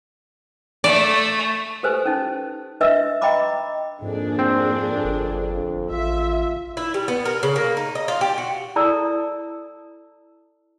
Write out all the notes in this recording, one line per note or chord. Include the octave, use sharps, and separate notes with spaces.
A3 D5
G4 A4 B4 C5 G#5
C#4 D#4
D4 B4 D#5 E5 E6
D#5 G5 A#5 B5 D6
F2 G#2 A#3 D4 G#4
C4
G1
A1 F4 E5
E4
G3
B3
A#4
C#3
A#3
D#4
D#5
F4
G4
F#4
E4 A4 D5 A5 A#5 E6